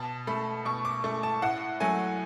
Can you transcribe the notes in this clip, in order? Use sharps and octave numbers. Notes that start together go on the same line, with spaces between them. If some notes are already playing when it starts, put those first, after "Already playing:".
Already playing: B2 A5
A3 B5
B2 C#6
D6
A3 C#6
A5
A2 F#5
F#3 A3 G#5